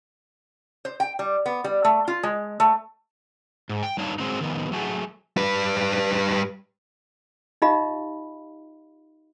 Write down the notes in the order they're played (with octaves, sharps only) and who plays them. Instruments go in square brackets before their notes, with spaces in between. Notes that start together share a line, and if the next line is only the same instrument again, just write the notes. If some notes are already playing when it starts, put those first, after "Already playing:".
[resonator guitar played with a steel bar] C5
G5
G3
B3
G3
A3
F4
G#3
A3
[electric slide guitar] G#2
G5
G2 G3 D#4 C#5 F5 A5
F#3 G#3 C4 D#4
D#3 F3 B3
F#3 A3 F#4 G#4
[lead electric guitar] G3 B4
[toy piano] D#4 F4 G4 D#5 F5 B5